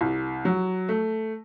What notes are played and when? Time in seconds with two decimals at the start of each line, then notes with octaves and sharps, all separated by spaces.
0.01 C2
0.45 F#3
0.89 A3